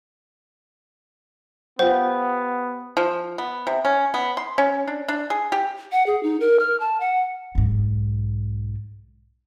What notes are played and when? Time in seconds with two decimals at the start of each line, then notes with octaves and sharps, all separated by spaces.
1.79 B3 F4 G4 C5 F#5
2.97 F3
3.38 B3
3.67 C3
3.85 C#4
4.14 B3
4.37 C6
4.58 C#4
4.87 D4
5.08 D4
5.30 G#4
5.52 G4
5.92 F#5
6.06 G#4
6.23 D#4
6.40 A#4
6.59 F6
6.80 A5
7.00 F#5
7.55 B1 G#2